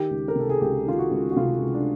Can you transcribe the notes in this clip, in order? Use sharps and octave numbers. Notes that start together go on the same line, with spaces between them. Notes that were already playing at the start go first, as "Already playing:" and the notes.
Already playing: D#3 G4
C#2
A#4
C3 A4
G#4
C#2 G4
D#3 F4
F#4
C#2
F#4
C3 F4
C#2
D4